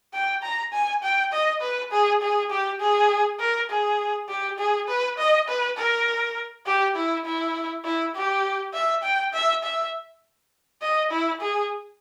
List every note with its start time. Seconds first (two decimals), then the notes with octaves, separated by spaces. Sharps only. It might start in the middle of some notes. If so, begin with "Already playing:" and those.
0.14 G5
0.43 A#5
0.73 G#5
1.03 G5
1.33 D#5
1.61 B4
1.92 G#4
2.22 G#4
2.50 G4
2.80 G#4
3.40 A#4
3.70 G#4
4.29 G4
4.59 G#4
4.88 B4
5.18 D#5
5.48 B4
5.77 A#4
6.66 G4
6.96 E4
7.25 E4
7.85 E4
8.15 G4
8.73 E5
9.03 G5
9.33 E5
9.63 E5
10.82 D#5
11.11 E4
11.41 G#4